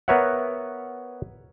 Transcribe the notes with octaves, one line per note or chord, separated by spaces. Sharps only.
B3 A#4 B4 C#5 E5 F#5